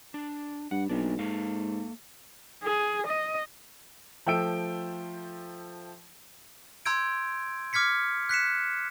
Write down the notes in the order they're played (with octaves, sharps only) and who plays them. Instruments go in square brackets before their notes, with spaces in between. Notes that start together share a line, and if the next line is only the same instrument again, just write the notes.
[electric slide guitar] D4
[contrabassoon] G2 [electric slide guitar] F#5
[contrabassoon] B1 [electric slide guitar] A#3 D4
[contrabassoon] G#2 [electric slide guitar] A#3 A4 F5
[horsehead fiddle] G#4
D#5
[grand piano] F3 A3 G5 E6 D7
[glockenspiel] A#5 C6 E6 G6 G#6 D7
D6 F6 G#6 B6 C#7
F#6 B6 C#7 E7